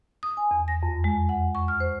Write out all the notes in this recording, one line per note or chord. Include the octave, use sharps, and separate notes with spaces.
D#6
G#5
E2
A#6
F2
G#3
F#5
C#6
F6
C5